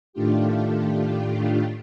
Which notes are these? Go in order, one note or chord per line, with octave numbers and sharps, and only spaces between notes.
A2 D#3 A3 D4 F4 G4